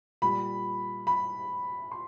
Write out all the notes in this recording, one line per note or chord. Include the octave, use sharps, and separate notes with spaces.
A#2 G3 B5
B5
C6